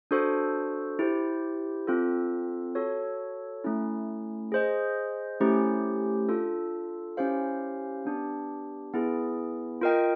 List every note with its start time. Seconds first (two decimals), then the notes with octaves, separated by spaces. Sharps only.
0.11 D4 F#4 A4 C5
0.99 E4 G4 C5
1.87 C4 F4 A4
2.75 F#4 A4 C#5
3.64 A3 C#4 E4
4.52 G#4 C5 D#5
5.40 A3 C#4 E4 G4 C5
6.28 D4 F4 A4
7.17 C#4 E4 G4 C5 F5
8.05 B3 D4 G4
8.93 B3 E4 G#4
9.82 F4 A#4 D#5 G5